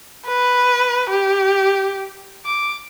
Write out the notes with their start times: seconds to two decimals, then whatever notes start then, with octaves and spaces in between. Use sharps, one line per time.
0.27 B4
1.10 G4
2.45 D6